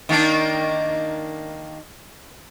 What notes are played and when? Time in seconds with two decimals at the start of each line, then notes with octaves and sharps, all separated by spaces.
0.09 D#3 A#3 D4